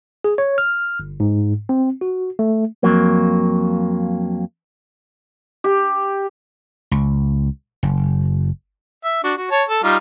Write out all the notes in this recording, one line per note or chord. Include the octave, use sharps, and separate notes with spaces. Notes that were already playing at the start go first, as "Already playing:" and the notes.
G#4
C#5
F6
G1
G#2
C4
F#4
A3
F2 F#3 A#3
G4
C#2
F#1
E5
D4 F#4
F#4
C#5 A5
A4
G3 D#4 F4